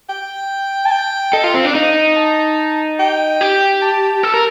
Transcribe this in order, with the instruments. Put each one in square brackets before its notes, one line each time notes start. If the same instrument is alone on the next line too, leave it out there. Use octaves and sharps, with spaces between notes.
[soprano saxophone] G5
A5
G5
[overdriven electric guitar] A4 [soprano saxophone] D#5
[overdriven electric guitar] F4
[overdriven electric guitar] C4 [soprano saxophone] F5
[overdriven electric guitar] D4
D#4
[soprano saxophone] A5
G5
[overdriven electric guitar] G4
[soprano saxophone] A5
[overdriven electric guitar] A4
A#4